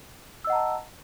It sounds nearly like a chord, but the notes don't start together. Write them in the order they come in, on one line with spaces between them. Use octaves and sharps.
E6 D#5 F#5 A#5 A5